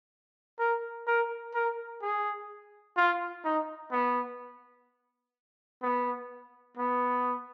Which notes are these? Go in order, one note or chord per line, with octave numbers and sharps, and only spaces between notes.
A#4
A#4
A#4
G#4
F4
D#4
B3
B3
B3